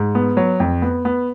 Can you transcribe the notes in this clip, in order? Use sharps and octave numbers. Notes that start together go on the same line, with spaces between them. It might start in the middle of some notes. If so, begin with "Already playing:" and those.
Already playing: G#2
B3
F#3
F2
B3
B3